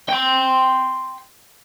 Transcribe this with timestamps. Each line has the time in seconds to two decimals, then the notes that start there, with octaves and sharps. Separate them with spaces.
0.09 G5 C6